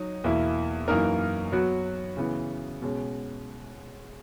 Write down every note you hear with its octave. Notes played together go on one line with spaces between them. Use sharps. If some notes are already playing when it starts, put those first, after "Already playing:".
Already playing: F#3 D#4
E2 B2 A#3 E4
F#2 E3 A#3 D#4 A#4
F#3 B3 F#4
C#3 E3 B3
B2 G#3 C#4